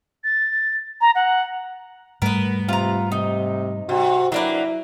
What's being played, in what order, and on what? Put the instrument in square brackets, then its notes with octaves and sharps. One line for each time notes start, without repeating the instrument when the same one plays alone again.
[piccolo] A6
A#5
F#5
[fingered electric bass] G#2 G3 A3 [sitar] B3 [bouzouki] A#4 B4
[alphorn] C3 [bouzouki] F4 A#5
[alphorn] C3 [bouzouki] D#4
[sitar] C3 [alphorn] F#4
[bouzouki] F#3 D4 B4 [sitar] A#3 [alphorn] E4